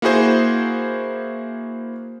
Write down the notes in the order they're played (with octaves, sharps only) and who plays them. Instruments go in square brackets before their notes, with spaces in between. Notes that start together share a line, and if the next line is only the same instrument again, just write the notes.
[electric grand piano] A#3 E4 F#4 G#4 C5